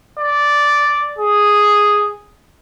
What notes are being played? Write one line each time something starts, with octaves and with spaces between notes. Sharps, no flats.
D5
G#4